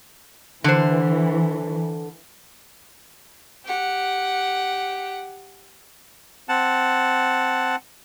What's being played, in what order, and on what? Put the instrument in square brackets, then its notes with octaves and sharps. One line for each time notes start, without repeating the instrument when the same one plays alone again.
[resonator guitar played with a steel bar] D3 C5 [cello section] E3
[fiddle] G4 F#5
[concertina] C4 F#5 A5